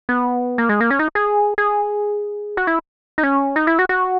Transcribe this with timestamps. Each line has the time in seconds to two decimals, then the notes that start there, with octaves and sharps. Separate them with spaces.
0.09 B3
0.58 A#3
0.69 G#3
0.81 A#3
0.91 C#4
0.99 D#4
1.15 G#4
1.58 G#4
2.57 F#4
2.67 E4
3.18 D#4
3.23 C#4
3.56 D#4
3.67 E4
3.79 F#4
3.89 F#4